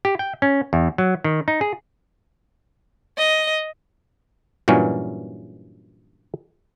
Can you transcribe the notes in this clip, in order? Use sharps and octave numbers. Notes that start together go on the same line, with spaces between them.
G4
G5
C#4
E2
F#3
D#3
D#4
G#4
D#5
G2 A#2 E3 F#3 C#4